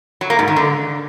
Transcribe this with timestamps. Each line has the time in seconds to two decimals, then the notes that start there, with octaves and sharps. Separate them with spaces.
0.21 F#3
0.30 A#3
0.39 G#2
0.48 D#3
0.56 D3